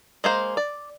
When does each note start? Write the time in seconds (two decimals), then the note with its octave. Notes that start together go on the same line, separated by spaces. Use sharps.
0.24 G#3 A#3 C5
0.57 D5